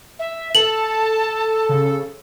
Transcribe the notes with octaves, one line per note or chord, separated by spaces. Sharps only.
E5
A4 A5 F#7
C#3